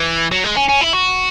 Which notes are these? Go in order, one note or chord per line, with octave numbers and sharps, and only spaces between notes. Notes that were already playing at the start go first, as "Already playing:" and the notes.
Already playing: E3
F#3
G#3
C#4
C#4
E4
F#4